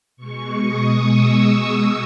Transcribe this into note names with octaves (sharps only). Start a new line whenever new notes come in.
B2 G#3 C#6
D#6
E6